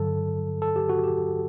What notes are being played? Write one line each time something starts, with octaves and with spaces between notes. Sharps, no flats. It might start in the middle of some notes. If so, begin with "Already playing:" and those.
Already playing: G2 D3 F#3 A4
A4
G4
F#4
G4